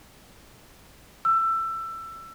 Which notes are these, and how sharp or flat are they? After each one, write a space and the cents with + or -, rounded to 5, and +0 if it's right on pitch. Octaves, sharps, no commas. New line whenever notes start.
E6 +20